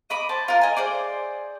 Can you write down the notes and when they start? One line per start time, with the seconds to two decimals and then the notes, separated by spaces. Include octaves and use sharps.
0.10 D#5 B5 D6 D#6
0.29 C5 A5
0.48 F4 A#4
0.61 D#5 G#5
0.77 G#4 C5 D5